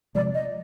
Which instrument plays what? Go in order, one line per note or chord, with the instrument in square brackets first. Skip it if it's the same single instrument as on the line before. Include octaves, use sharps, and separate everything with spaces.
[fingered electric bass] C3 F3 G#3 [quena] D5
[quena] D#5